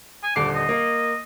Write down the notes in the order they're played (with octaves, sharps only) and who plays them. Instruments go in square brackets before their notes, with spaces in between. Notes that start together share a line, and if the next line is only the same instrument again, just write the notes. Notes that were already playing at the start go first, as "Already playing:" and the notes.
[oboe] G#5
[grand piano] D#1 D3 C7 [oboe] D6
[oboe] D#5
[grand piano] A#3